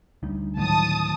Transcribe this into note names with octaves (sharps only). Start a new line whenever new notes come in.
D2 G3 D#4
D2 A2 D#3 F#3 A5 D#6